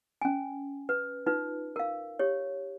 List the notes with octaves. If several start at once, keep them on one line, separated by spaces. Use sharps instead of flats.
C#4 G#5
B4
D#4 F4 B4
A#4 F5
G4 C#5